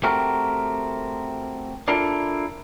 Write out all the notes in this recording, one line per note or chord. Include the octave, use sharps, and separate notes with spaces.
A3 C4 F#4 G4 A#4
D4 E4 F4 A4 A#4 D5